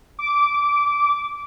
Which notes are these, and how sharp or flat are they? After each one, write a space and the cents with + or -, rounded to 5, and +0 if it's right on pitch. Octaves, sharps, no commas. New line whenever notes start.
D6 -15